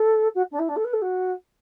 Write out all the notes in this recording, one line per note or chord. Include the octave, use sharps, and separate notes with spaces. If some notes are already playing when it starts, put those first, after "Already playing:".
Already playing: A4
F#4
D4
E4
D4
A4
B4
A4
F#4